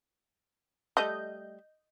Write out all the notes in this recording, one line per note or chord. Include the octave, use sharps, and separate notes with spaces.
G3 A3 D#5 G6